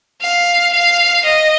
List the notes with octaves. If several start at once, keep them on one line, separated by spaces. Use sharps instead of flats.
F5
F5
D#5